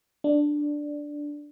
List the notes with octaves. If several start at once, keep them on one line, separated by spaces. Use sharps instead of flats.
D4